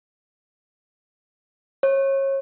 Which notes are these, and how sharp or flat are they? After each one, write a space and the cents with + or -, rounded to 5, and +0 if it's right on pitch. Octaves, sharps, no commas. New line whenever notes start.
C#5 -30